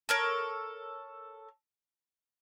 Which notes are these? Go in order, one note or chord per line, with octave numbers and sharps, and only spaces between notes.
A4 A#4 C#5